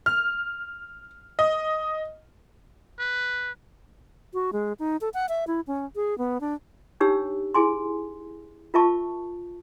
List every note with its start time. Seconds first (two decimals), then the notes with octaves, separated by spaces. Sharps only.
0.06 F6
1.39 D#5
2.99 B4
4.34 F#4
4.53 G#3
4.79 D#4
5.01 A4
5.14 F#5
5.29 E5
5.47 E4
5.67 C#4
5.95 G#4
6.18 B3
6.41 D4
7.00 D4 D#4 G4 C#5 E6
7.54 E4 G#4 G#5 C6
8.74 F4 A#4 E5 A5 C#6